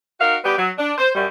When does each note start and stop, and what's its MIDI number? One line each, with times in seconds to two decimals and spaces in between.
0.20 0.36 63
0.20 0.36 66
0.20 0.36 70
0.20 0.36 77
0.44 0.56 55
0.44 0.56 59
0.44 0.56 67
0.57 0.69 54
0.77 0.92 62
0.97 1.10 72
1.14 1.25 42
1.14 1.25 55